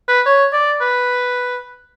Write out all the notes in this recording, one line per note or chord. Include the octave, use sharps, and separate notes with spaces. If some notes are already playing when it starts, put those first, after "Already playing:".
B4
C#5
D5
B4